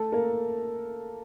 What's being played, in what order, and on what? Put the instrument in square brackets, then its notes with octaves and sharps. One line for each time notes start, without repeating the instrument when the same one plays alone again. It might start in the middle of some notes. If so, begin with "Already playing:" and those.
Already playing: [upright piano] A3 A4
A#3 A#4